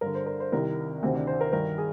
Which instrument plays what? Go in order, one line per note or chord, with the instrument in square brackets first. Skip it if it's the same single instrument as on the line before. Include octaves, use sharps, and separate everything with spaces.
[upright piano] G2 D3 A#4
C5
A#4
C5
C2 C3 D#3 A#4
D2 C3 D#3 C4
D4
C5
A#4
G2 D#3 A#4
G#4